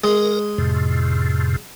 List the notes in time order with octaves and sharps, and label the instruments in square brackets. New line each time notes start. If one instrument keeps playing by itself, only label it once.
[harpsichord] G#3 [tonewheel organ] A#4
[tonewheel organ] F2 A2 C3